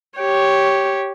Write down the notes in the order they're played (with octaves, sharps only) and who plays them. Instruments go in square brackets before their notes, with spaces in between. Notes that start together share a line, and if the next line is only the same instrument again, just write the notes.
[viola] G4 C#5